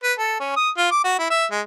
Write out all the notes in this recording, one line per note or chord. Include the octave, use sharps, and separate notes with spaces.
B4
A4
C#4
D#6
F4
D6
F#4
E4
E5
G#3